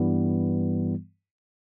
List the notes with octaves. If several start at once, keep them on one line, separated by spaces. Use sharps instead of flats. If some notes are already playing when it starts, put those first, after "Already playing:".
Already playing: G2 E3 G3 B3